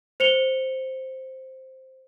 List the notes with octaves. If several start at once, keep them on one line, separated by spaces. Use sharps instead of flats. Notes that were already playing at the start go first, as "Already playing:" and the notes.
C5 C#7 F7 G7